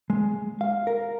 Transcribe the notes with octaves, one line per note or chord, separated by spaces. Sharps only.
G#3
F5
A#4